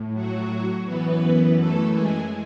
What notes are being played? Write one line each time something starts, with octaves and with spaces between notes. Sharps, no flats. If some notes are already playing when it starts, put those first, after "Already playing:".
Already playing: A2
F#3 F#4
F#2 E3 B3 B4
A3 A4
G#3 G#4